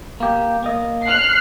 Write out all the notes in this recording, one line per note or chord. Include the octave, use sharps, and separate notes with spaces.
A#3 G4
A#3 D#5
F6 F#6 C7